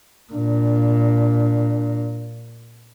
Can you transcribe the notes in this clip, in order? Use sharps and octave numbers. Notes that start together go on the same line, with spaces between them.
A#2 D4